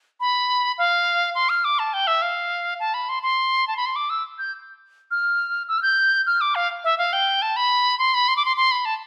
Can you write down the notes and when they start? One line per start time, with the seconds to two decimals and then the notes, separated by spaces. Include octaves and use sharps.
0.20 B5
0.78 F5
1.35 C6
1.49 F6
1.65 D6
1.79 A5
1.94 G5
2.07 E5
2.22 F5
2.80 A5
2.94 B5
3.09 C6
3.23 C6
3.68 A5
3.77 B5
3.86 C6
3.96 D6
4.10 E6
4.39 G6
5.11 F6
5.68 E6
5.78 F6
5.83 G6
6.26 F6
6.41 D6
6.55 F5
6.84 E5
6.98 F5
7.13 G5
7.42 A5
7.56 B5
7.99 C6
8.14 B5
8.28 C6
8.37 D6
8.45 C6
8.57 C6
8.71 B5
8.85 A5